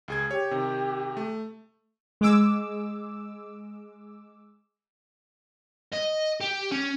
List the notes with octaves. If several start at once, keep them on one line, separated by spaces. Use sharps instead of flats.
C#2 G#4 G#6
G4 C#5
C3 D#3
A3
G#3 D6 E6
D#5
G4
C#4